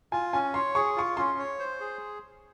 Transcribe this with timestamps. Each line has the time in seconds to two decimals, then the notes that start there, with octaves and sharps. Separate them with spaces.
0.12 F4 G#5
0.33 C#4 G#5
0.54 C#5 C6
0.75 G#4 C#6
0.96 F4 C#6
1.17 C#4 C6
1.39 C#5
1.59 C5
1.80 G#4